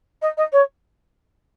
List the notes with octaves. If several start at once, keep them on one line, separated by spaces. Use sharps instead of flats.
D#5
D#5
C#5